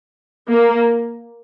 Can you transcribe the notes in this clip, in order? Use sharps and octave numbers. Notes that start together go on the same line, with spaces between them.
A#3